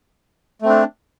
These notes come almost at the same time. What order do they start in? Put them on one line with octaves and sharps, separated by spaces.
A3 C4 D4